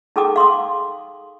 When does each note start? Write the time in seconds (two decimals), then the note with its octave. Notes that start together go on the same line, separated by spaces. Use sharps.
0.16 D#4 G#4 A4 G5 D6 D#6
0.36 F5 C6 D6 D#6